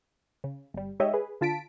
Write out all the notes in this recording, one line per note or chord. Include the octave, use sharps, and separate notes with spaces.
C#3
G1 G3
G#3 D#4 G4 C#5 D#5 E5
G#4 B4
D3 F4 A5 B6 D7